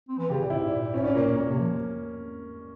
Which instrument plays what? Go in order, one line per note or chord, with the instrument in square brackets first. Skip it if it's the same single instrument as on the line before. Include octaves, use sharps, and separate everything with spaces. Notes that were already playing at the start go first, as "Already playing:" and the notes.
[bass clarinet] C4
E3
[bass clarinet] C#3 [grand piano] G4
[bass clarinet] A#2
[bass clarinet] G#2 [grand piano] E4
[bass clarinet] A#2
A#2
[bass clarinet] G#2 [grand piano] C#4
[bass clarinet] A#2 [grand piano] C#4
[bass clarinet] A#2 [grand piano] A#3
[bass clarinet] A#2
[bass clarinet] A#2 [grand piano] A#3
[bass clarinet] C3
F3